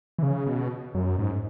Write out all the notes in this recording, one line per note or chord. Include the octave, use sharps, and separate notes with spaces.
E3
C#3
B2
F#2
G#2